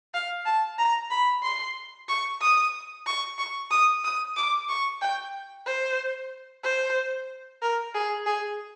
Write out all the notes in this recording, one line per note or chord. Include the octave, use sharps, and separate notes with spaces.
F5
A5
A#5
B5
C6
C#6
D#6
C#6
C#6
D#6
D#6
D6
C#6
G5
C5
C5
A#4
G#4
G#4